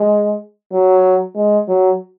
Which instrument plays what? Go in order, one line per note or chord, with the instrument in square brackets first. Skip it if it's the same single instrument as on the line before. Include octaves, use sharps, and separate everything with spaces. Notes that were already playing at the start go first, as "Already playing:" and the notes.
Already playing: [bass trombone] G#3
F#3
G#3
F#3